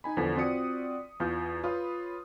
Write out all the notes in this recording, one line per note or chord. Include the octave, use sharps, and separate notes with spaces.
D#4 G#5 B5
E2 D3 F3 B6
C4 F4 F#4 D5 D#6 C#7
E2 F4 F5 G6
F4 B4 C#5 F5 B5 D#6